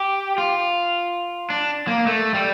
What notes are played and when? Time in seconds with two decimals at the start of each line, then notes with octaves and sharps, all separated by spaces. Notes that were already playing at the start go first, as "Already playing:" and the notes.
Already playing: G4
0.38 F4
1.50 D4
1.87 A#3
2.07 A3
2.34 G3